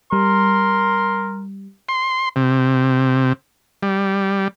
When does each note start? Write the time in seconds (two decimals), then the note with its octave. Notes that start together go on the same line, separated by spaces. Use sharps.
0.13 G3 A#4 C6
1.89 C6
2.36 C3
3.83 G3